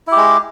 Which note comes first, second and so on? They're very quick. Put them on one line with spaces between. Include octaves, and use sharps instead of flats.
E4 G4 G#3